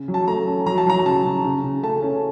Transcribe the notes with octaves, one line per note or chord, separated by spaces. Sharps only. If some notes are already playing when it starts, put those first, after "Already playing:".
Already playing: C#3
F#3
A5
A3 A#5
C#4
F#3 A#5
A5
F#3 A#5
C#3 A5
C#3
C#3
C#3
A3 A5
C#4